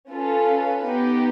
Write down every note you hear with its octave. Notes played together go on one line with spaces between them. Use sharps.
C#4 F4 A4 B4
B3 D#4 G4